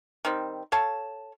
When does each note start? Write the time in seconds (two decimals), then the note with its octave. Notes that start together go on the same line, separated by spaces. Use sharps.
0.25 D#3 G3 C4
0.72 A4 C#5 F5 A5